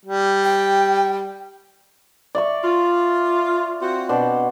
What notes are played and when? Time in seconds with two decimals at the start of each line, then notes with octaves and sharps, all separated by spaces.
0.05 G3
0.44 G5
2.35 D5 E5 C#6
2.63 F4
3.80 C4 F4 F#4
4.09 B2 C4 D4 D5